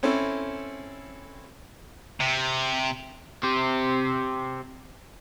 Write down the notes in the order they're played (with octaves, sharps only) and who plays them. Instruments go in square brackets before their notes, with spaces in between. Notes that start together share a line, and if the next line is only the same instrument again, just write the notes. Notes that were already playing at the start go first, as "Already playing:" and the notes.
[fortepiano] C4 C#4 E4 A4
[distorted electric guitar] C3
[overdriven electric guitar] C4 G4